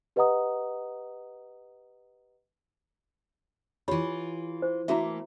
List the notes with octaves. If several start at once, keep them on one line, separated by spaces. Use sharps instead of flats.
G4 B4 D#5 F#5 A#5 D#6
E3 F4 G4 C#5 B5
C5
E3 A3 A#3 E4 F#4 E5